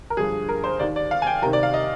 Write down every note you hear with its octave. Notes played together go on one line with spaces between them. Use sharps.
A#4
G2 D3 F3 G#4
A#4
C5
D#2 D#3 D5
D5
F5
G#5
G5
C2 C3 D#3 A#4
D5
F5
D#5